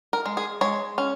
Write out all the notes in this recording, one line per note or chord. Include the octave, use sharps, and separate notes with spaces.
A#4
G#3
G#4
G#3 C#5
C#4